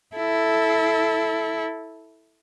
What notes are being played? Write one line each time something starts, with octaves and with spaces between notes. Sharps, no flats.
E4 A4